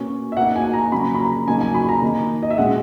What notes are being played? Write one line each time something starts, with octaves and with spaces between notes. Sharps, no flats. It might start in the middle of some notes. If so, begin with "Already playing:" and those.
Already playing: B2 A#3 C#4
E5
B2 A#3 D#4 F#5
G#5
A#5
C#3 F#3 A#3 B5
B5
A#5
C#3 F#3 A#3 D#4 G#5
G#5
B5
A#5
D#3 A#3 D#4
D#5
E5
A#2 G#3 C#4 F#5